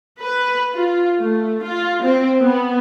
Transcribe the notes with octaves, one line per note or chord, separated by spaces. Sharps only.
B4
F4
A3
F4
C4
B3